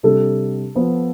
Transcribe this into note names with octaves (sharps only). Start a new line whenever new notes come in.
C3 G3 D4 G4 A4
F3 B3 F4 C5